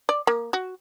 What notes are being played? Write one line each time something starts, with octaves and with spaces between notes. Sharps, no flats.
D5
A#3
F#4